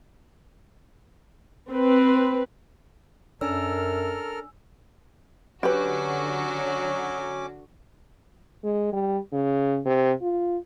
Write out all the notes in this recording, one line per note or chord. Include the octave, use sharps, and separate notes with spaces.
C4 B4
F#2 C#4 D4 A4 A#4 G#5 E6 F6
D3 F#3 C#4 F#4 G4 B4 D6
G#3
G3
C#3
C3
F4